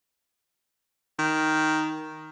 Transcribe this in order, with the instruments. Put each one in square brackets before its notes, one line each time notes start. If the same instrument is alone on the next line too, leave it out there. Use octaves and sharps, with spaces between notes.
[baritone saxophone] D#3